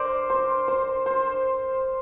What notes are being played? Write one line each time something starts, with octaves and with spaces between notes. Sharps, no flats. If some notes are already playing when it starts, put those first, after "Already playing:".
Already playing: A#4 C5 D5
C5
C5
C5